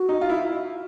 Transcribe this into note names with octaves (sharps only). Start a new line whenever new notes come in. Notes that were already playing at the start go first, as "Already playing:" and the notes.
Already playing: F#4
D#4
F4
E4